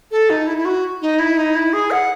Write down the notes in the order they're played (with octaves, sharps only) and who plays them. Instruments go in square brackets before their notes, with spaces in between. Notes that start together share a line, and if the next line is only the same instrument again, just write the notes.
[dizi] A4
D#4
E4
E4
F#4
D#4
E4
D#4
E4
G#4
F#5